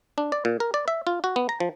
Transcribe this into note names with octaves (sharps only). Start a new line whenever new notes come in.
D4
D5
A#2
A#4
D5
E5
F4
F#4
B3
A#5
F3